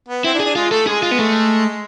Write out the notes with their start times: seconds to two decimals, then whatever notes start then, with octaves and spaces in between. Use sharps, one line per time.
0.08 B3
0.24 C4 E4
0.34 D4
0.40 G#4
0.45 D4
0.56 G#3 F4
0.71 A3 A4
0.87 G#3 G#4
1.03 F4
1.11 B3
1.19 A3